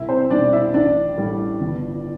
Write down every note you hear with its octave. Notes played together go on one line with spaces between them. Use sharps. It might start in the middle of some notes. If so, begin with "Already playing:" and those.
Already playing: C2 E4 E5
C4 C5
B2 G3 D4 D5
E4 E5
A1 D4 D5
A2 G3
G1